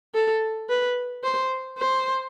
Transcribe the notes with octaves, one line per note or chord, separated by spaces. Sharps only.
A4
B4
C5
C5